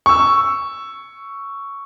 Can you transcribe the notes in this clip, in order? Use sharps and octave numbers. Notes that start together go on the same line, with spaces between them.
C#6 E6